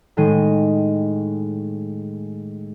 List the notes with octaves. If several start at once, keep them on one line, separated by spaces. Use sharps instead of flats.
A2 D#3 G#3 D#5 D#7